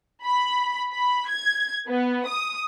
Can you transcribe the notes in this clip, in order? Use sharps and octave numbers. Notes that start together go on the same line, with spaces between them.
B5
B5
G#6
B3
D#6